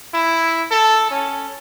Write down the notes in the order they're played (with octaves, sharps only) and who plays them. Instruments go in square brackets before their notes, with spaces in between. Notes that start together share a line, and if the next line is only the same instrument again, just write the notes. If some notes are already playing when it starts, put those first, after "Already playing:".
[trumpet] E4
A4
C#4